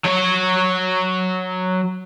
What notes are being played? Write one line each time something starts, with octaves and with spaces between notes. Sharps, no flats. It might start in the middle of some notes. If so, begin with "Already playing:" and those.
F#3 C#5